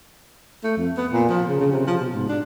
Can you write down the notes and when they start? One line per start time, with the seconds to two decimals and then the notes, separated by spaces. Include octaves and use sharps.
0.64 A3
0.77 F2
0.97 B3
1.12 A#2
1.29 F3
1.48 C#3
1.60 C#3
1.72 C3
1.87 F3
2.01 B2
2.14 G#2
2.29 D4